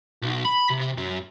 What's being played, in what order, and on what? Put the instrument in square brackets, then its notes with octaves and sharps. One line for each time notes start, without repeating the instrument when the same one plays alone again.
[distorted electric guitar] B1
B5
C3
F#2